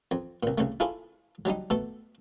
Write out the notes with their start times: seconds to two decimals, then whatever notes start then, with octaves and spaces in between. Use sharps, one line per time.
0.11 F2
0.43 C2 A#2
0.58 C2 C#3 A3
0.80 E4 F4 G#4 A4 C#5
1.45 F#3 G3 D4 D#4
1.70 B2 A3 A4